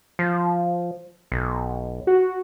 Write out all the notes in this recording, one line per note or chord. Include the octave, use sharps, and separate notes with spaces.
F3
B1
F#4